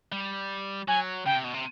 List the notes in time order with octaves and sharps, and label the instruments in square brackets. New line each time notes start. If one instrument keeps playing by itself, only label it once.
[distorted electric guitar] G3
[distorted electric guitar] F#3 [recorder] G#5
[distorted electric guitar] C#3 [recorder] G5
[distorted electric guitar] C3
B2
C3